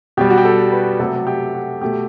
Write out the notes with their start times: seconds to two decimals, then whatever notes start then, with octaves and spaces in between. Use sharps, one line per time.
0.17 B2 G3 G4
0.30 F#4
0.38 G4
0.45 A4
0.72 B4
0.99 C3 F#3 A3 A4
1.27 G4
1.54 F#4
1.81 B2 A3 G4